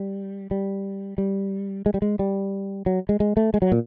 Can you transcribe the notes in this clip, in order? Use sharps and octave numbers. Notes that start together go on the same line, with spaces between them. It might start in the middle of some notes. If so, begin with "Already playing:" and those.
Already playing: G3
G3
G3
G#3
G3
G#3
G3
F#3
G#3
G#3
A3
G#3
F#3
A#2